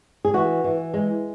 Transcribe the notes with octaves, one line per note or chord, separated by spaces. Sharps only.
G#4
E3 F#4
E3
G#3